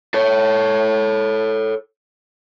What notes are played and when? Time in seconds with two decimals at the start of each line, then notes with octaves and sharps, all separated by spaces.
0.14 A4 C#5